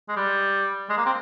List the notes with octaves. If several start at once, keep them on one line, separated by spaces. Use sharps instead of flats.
G#3
G3
G#3
A#3
C4